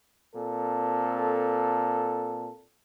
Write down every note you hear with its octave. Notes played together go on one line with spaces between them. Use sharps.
A#2 C4 A4